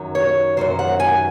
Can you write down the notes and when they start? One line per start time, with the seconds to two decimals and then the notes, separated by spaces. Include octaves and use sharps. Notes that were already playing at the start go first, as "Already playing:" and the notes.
Already playing: F#2 D#3 F#3
0.15 C#5
0.57 F#2 D#3 F#3 C5
0.79 F#5
1.00 G#5